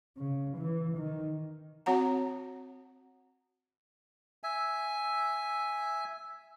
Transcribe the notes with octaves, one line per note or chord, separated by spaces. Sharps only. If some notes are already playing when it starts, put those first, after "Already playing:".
C#3
E3
D#3
C4 F#4 C#5 F#5 A#5
E5 G#5